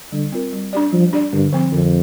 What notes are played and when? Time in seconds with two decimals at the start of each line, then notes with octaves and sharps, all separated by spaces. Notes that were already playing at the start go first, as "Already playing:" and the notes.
0.12 D3 G3
0.32 C4 F4 A#4
0.53 G3
0.73 D4 G4 D5
0.92 F3 G3
1.13 D4 G4 D5
1.33 G2 D3
1.53 F3 C4
1.72 F2 D3